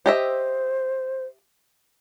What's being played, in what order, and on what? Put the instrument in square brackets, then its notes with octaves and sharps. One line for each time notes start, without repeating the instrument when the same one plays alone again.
[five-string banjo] G4 D#5 E5 [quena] C5